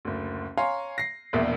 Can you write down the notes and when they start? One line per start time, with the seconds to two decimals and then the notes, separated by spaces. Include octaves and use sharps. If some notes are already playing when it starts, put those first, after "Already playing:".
0.05 F#1 D2
0.57 C#5 F5 G#5 A#5 C6
0.98 A#6 C7
1.33 E1 A#1 E2 A#3 E5